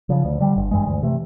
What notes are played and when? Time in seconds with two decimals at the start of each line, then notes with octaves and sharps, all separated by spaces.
0.09 C#3 F3
0.25 D2
0.40 D3 G3
0.56 G1
0.71 G2 E3 G#3
0.87 D2
1.03 C3 E3 A3